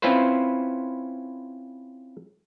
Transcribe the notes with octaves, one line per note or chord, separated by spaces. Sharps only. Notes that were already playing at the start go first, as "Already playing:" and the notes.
C4 C#4 E4 F4 B4 C5